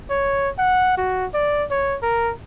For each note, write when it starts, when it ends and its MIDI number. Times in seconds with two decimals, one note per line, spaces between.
0.10 0.49 73
0.59 0.96 78
0.98 1.26 66
1.34 1.65 74
1.71 1.98 73
2.03 2.32 70